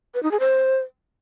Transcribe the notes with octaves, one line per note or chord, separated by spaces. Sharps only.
B4
D#4
G#4
C5